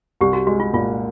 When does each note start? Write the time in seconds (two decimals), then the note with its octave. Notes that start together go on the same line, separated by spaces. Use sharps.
0.21 C2 G4
0.33 F#4
0.47 G#3 F#4
0.60 F4
0.73 A#2 F4